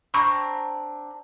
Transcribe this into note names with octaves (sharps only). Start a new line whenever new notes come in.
C4 D4 A#5 B5 C#6